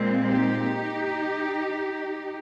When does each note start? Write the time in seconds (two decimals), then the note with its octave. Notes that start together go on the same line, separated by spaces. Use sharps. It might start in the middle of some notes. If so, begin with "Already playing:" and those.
Already playing: A#2 G#3 C4
0.30 D#4 G4